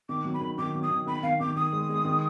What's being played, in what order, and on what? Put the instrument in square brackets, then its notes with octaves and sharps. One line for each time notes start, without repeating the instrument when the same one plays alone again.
[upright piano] D#3 [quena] D6
[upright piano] F#3
[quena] B5
[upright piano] D#3
[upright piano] D#3 [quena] D6
[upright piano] F#3
[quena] D#6
[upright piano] D#3
[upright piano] D#3 [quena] B5
[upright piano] D#3 [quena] F5
[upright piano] D#3 [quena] D6
[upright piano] D#3 [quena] D#6
[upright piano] G#3
G#3
D#3